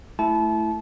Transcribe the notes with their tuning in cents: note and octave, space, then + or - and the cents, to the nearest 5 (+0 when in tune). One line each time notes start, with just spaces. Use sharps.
A3 +0 E4 +0 A5 -30